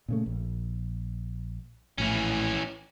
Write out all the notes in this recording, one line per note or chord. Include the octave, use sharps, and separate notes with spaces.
A#2 C#3 A3
A#1
A#1 A2 E3 C#4